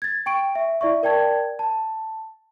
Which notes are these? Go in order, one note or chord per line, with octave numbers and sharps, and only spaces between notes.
G#6 A6
G5 C#6 D7
E5
E4 D5 E5 C#6
A#4 D5 G5 A5 G#6
A5